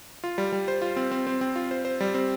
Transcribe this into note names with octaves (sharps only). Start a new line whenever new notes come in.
F4
G3
G3
C5
F4
C4
C4
C4
C4
F4
C5
C5
G3
C4